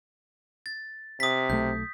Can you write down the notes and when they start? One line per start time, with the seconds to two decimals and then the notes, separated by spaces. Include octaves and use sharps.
0.66 A6
1.20 C3 D#6 B6
1.50 B1 A3 G6